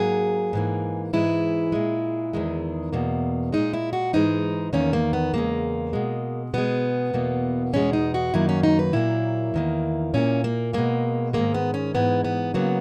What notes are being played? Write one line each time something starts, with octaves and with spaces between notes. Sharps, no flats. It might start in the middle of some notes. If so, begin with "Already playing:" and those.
Already playing: G#2 F#3 A#3 G#4
G#2 E3 A#3
G#2 E3 G#3 E4
A#2 G#3
E2 D#3 G#3
E2 B2 A#3
A#2 G#3 D#4
E4
F#4
G#2 E3 G#3 D#4
E2 D#3 A#3 C#4
A#3
B3
E2 C#3 G#3 A#3
B2 G#3
B2 G#3 B3
E2 B2 A#3
E2 B2 G#3 C#4
D#4
F#4
F#2 D#3 F#3 A#3 E4
C#4
D#4
B4
A#2 F#3 A#3 E4
E2 D#3 A#3
A#2 A#3 C#4
A#3
B2 G#3 A#3
G#2 D#3 G#3 A#3
B3
C#4
G#2 E3 G#3 B3
B3
C#3 F#3 A#3 B3